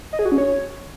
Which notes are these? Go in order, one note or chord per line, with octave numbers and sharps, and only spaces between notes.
D#5
G#4
F#4
C#4
C#5